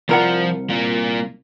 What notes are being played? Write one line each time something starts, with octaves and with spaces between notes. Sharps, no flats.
C2 F3 F4 A#4 F#5
A#3 F4